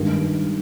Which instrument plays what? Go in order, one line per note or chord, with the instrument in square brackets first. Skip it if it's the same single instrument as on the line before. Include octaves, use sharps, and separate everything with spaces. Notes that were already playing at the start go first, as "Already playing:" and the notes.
Already playing: [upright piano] G2 D#3 G#3